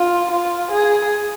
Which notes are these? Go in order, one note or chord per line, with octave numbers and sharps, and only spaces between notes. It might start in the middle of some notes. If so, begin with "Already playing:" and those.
Already playing: F4
F4
G#4